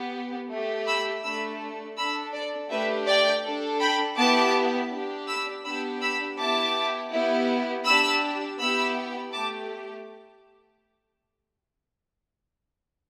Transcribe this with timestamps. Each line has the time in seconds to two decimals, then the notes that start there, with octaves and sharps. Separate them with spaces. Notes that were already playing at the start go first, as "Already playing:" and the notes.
Already playing: B3 G4
0.50 A3 G4
0.86 B5 E6
1.23 A3 D4 A4 B5 E6
1.97 D4 A4 B5 E6
2.33 D5
2.70 A3 D4 G4 B4 E5
3.07 D5 G5
3.44 D4 A4
3.80 G5 B5
4.17 B3 E4 G4 A5 D6
4.92 D4 G4
5.27 B5 E6
5.64 B3 D4 G4 B5 E6
6.01 B5 E6
6.38 B3 E4 G4 A5 D6
7.11 B3 E4 G4
7.84 D4 G4 B5 E6
8.58 B3 E4 G4 B5 E6
9.32 A3 G4 A5 D6